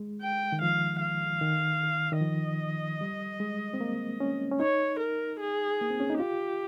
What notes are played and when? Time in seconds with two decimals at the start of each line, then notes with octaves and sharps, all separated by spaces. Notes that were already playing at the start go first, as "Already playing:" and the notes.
Already playing: G#3
0.22 G5
0.52 D#3
0.62 F3 F5
1.01 F5
1.41 D#3
2.12 D#3
2.21 F3 D#5
3.01 G3
3.40 G#3
3.74 C4
3.81 A#3
4.20 C#4
4.51 C#4
4.60 D#4 C#5
5.00 A#4
5.40 G#4
5.81 A#3
5.90 C4
6.00 C#4
6.10 D#4
6.19 F4 G4